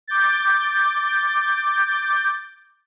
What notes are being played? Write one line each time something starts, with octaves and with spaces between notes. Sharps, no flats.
D6 G6 A6